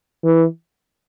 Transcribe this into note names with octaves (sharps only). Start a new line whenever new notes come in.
E3